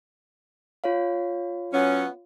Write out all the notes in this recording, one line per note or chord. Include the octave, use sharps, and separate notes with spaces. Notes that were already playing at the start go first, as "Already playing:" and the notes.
F4 C#5 F5
F#3 B3 C#4